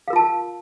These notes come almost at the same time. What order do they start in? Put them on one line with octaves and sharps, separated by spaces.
F5 A#4 F4 A5